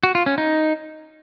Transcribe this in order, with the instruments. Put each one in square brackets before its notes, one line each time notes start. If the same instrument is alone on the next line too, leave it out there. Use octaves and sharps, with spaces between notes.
[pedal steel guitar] F#4
F4
C#4
D#4